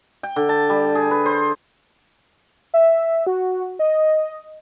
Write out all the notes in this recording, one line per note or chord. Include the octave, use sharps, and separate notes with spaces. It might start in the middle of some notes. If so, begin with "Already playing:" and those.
G5
D3
A5
G3
G#4
B4
C5
E5
F#4
D#5